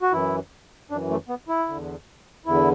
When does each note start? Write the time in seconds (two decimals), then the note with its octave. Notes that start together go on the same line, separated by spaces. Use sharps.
0.02 F#4
0.13 F#2 E3 E4
0.90 F#2 D4
0.94 E3
1.10 A3
1.29 B3
1.48 E4
1.69 E2 D3
2.46 E2 D3 E4